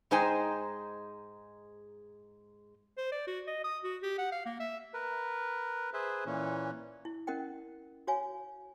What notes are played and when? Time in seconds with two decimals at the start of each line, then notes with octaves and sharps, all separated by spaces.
0.11 G#2 G#3 D#4 C5 G5 G#5
2.97 C5
3.12 D5
3.27 F#4
3.47 D#5
3.64 D#6
3.84 F#4
4.02 G4
4.18 F#5
4.32 F5
4.46 A#3
4.60 E5
4.94 A#4 B4
5.94 G#4 B4 C5 E5
6.26 A#2 E3 C#4
7.05 E4
7.27 C#4 A#4 D#5 F#5 G5
8.07 F#4 C#5 F5 G#5